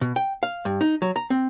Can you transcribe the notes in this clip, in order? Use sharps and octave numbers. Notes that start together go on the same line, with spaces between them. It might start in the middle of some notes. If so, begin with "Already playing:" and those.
B2
G5
F5
G2
D#4
F#3
A#5
C4